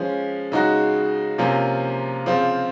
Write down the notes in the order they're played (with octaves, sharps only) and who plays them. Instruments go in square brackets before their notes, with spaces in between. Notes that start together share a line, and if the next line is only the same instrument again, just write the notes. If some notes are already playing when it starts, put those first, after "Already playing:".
Already playing: [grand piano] F3 G#3 C#4
C#3 G#3 D#4 F#4
C3 F3 A#3 C#4 F4
C#3 F3 C4 F4